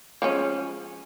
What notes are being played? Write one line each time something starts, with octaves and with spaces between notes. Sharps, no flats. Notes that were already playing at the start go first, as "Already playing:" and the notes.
F3 G#3 C#4